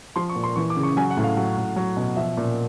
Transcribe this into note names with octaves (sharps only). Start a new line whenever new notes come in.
F3 C6
C#6
A#2
C6
E3 C#6
D6
C#3
C#6
F#3 G#5
F#5
A2
F5
F#3
A2
F#3
B2
F3 E5
A#2